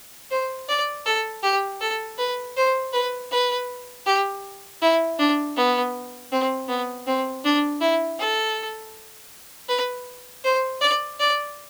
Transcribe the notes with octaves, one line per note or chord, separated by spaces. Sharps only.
C5
D5
A4
G4
A4
B4
C5
B4
B4
G4
E4
D4
B3
C4
B3
C4
D4
E4
A4
B4
C5
D5
D5